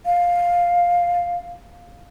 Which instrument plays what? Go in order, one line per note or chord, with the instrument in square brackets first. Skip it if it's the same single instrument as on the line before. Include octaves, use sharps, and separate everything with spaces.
[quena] F5